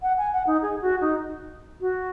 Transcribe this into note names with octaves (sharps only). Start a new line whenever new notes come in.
F#5
G#5
F#5
D#4
G#4
F#4
D#4
F#4